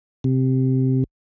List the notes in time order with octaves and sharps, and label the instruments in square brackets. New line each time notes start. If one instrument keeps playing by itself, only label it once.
[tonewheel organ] C3